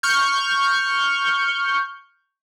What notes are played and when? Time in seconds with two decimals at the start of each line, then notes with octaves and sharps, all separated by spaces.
0.03 C#6 F6 G6